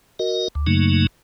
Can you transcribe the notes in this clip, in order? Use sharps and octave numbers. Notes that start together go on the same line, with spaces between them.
F#4 A#4 D#5
D2
F#2 C#3 F#3 A3 A#3 D#4